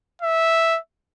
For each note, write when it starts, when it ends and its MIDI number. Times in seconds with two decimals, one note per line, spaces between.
0.22 0.79 76